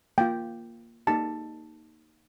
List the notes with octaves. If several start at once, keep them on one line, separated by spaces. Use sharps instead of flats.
A#3 F4 G5
A#3 D#4 G4 A5